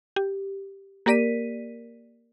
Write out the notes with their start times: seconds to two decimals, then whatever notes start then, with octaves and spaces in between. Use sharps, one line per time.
0.16 G4
1.06 A#3 G4 A#4 D5 B6 D#7